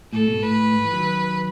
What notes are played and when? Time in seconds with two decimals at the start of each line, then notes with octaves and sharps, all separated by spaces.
0.13 A2 A4
0.27 G#2 B2
0.42 A2 B4
0.72 G#2
0.84 E3
0.92 D#3 F#3